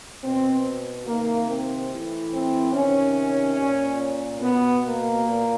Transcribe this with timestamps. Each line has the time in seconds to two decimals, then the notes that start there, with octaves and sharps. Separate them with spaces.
0.23 B2 C4
1.07 C3 D#3 A#3
1.49 C4
1.91 A2 E3
2.33 C4
2.74 C3 D#3 C#4
3.58 A#2
4.41 B2 B3
4.83 A#3
5.24 A#2